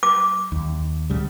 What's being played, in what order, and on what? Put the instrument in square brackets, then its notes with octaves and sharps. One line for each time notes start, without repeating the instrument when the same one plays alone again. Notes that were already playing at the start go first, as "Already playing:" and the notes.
[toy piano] D6
[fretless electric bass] D#2
D2 C#3 G3